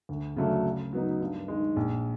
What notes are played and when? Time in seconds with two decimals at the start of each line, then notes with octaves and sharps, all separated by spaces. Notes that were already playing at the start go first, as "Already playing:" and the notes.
0.09 D2
0.36 C#3 F#3 A3 D4
0.65 C#3
0.93 F#3 B3 D#4
1.20 G2
1.48 D#3 G#3
1.76 A#1